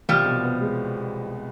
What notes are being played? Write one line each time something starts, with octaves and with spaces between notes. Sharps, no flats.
C2 F3 G3
B2
B3
G#3